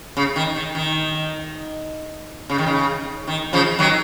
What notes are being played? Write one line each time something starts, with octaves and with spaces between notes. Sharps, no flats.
C#3
D#3
D#3
D#3
C#3
D#3
C#3
D#3
C#3 F3
D#3 F#3